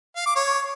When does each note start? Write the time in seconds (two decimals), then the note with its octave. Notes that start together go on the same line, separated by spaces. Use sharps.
0.16 F5
0.26 D6
0.36 C#5